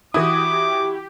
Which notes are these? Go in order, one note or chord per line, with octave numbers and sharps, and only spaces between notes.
E3 E4 F#4 G4 D6 D#6